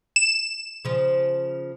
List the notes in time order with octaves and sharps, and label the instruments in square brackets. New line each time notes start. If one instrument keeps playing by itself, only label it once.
[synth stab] E7
[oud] C#3 F3